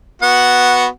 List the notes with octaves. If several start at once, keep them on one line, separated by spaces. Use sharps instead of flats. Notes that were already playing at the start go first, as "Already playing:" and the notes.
B3 F#4 F#5